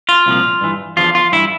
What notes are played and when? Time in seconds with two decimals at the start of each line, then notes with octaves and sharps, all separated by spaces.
0.09 F4
0.26 C2 A#2 F3
0.61 G2 E3
0.97 E2 D3 F3 F4
1.15 F4
1.32 G2 E3 E4